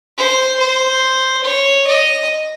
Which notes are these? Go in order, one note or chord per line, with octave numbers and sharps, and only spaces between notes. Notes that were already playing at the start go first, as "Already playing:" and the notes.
C5
C5
C#5
D#5